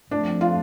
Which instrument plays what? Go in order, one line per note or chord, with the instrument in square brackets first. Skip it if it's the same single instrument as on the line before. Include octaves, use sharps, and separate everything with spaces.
[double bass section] F2 F3 A3 [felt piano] D4
[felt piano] F4